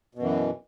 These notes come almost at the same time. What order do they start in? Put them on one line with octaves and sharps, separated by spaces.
B2 F#2 E3